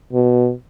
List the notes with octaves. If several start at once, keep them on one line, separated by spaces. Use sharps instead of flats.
B2